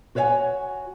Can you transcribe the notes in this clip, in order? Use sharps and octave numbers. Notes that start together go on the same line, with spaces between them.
F#4 B4 C#5 E5 F#5 G#5